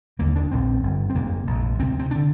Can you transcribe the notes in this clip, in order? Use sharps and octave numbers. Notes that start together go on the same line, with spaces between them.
F1 D#2 D3 A#3
D4
A#1 G#2 C4
G1 G2 D3
C4
F1 F2 C3 A#3
A#1 G#2
D2 C3 C4
C4
D3 D4